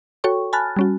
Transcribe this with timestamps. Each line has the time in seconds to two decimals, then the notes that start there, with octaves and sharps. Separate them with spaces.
0.24 F#4 A4 C#5 G5 C#6
0.53 G#5 A5 B5 F6 F#6 A6
0.76 G3 C#4 F#4